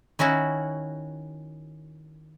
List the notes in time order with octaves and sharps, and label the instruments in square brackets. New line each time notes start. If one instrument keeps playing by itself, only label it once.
[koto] D#3 C#4 E4 F#4